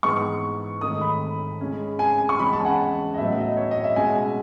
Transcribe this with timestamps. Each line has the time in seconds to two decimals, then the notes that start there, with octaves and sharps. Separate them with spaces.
0.03 G#2 E3 B3 C#6
0.81 G#2 D#3 A3 D#6
1.01 B5
1.61 C#3 G#3 C#4
1.99 G#5
2.29 C#6
2.39 E2 C#3 G#3 C#4 B5
2.53 A5
2.60 G#5
2.65 F#5
3.14 D#5
3.18 A2 F#3 B3 E5
3.38 D#5
3.57 C#5
3.71 D#5
3.84 E5
3.96 B2 G#3 C#4 G#5